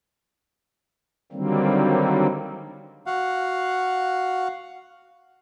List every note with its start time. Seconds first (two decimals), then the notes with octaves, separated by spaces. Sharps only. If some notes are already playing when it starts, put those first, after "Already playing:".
1.32 D3 D#3 F#3 G3 A#3 C4
3.06 F#4 F5 F#5